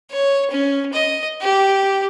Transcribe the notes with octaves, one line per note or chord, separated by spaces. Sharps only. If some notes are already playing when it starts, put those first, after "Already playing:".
C#5
C#4
D#5
G4